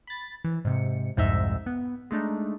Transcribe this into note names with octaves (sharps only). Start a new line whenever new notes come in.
B5 A6
E3
G#2 C3 C#7
C2 F2 G#2 D#4 E5 E6
B3
G#3 A3 D4 D#4